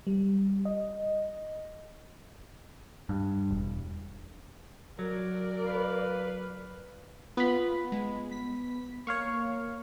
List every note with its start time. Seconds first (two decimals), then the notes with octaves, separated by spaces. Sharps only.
0.07 G3
0.65 D#5
3.09 G2
3.50 E1
4.99 F#3 A#4 D5
5.65 B4 F5
7.37 B3 F4 B5
7.92 G#3
8.31 B6
9.07 A#3 C#5 F5 C#6